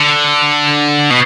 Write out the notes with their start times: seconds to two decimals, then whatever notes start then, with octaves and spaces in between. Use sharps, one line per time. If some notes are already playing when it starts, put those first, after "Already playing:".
Already playing: D3
1.10 B2